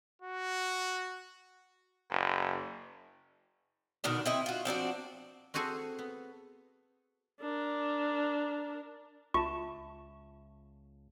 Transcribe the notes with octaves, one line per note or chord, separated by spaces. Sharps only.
F#4
F#1
B2 D3 D#3 D4
C4 E4 D#5
F4 F#4
F3 C4 D4 F#4
C4 F#4 G#4 A4 C5 G#5
B3
D4 A#4
C#2 F4 E5 A5 C#6 E7